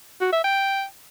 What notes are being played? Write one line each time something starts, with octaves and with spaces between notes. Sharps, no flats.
F#4
E5
G5